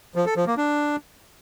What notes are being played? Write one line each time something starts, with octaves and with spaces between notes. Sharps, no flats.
F3
A4
F3
A#3
D4